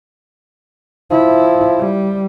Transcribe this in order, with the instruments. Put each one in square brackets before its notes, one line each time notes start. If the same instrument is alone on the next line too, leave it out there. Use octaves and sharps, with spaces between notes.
[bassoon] F3 [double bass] E4
[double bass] G3